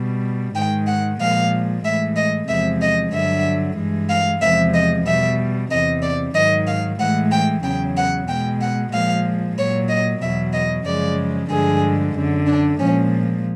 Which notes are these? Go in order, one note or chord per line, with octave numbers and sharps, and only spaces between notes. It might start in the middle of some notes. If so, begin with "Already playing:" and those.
Already playing: B2 G3
G#2 D#3 G#3 G5
F#5
A#2 F3 G#3 F5
A2 E3 G#3 E5
D#5
E2 C3 F3 G#3 E5
D#5
G2 D3 F#3 E5
G2 E3 G#3
F5
E2 C3 F3 G#3 E5
D#5
B2 G3 E5
E2 C3 E3 D#5
D5
G#2 D#3 F#3 D#5
F5
A2 E3 G#3 F#5
G5
E2 C#3 F#3 G5
F#5
B2 G#3 G5
F#5
A#2 F3 G#3 F5
A#2 F#3 C#5
D#5
E2 B2 F#3 E5
D#5
F#2 C#3 F3 G#3 D5
G2 D3 F3 G#3 G#4
F#2 D3 F#3
D4
A#2 F3 G#3 C#4